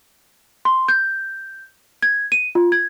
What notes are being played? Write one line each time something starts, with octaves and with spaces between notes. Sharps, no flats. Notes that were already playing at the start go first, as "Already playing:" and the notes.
C6
G6
G#6
D#7
F4
G#6